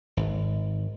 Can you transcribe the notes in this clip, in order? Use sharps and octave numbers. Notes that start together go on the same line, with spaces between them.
G#1